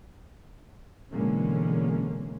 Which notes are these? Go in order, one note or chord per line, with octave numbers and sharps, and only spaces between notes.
B2 D3 E3 G#3 A#3 C#4